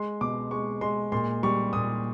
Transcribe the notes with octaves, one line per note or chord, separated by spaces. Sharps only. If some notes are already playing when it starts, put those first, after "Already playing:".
Already playing: G#3 C6
B2 D6
G#3 C#6
G#3 C6
A#2 C6
G3 C#6
A#2 D#6